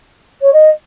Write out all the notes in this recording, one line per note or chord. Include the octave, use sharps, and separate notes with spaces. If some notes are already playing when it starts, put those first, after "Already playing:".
C#5
D#5